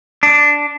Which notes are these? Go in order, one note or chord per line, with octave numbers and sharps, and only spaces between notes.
D4